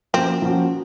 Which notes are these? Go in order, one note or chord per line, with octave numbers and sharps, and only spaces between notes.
F3 A#3 C4 C#4 F#4
F3 A#3 C#4 F#4